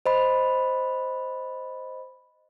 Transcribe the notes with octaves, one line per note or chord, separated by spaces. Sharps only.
C5 D#5 B5